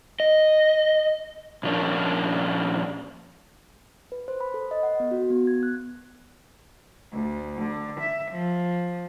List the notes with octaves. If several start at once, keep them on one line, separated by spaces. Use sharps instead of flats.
D#5
A#2 F3 C#4 D4 A#4
B4
C5
B5
A4
D#5
F#5
B3
F#4
B3
G#6
F#6
D2
D3
E5
F3